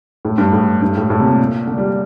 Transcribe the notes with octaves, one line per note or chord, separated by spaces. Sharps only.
A2
G2
A2
G2
A2
A2
C3
A#2
D3
G3